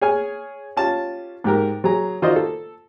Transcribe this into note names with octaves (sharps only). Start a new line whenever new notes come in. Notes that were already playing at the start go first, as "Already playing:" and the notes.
G#4 C#5 G#5 F6
C#4 F4 G4 A5
G#2 G4 A#4
F#3 G#4 A#5
D#3 F4 F#4 C5 D5 D#5
A4